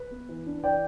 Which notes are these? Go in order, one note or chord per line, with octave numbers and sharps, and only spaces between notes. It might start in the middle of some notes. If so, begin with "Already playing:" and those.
Already playing: B4
B3
E3
D4
E3 D5 G5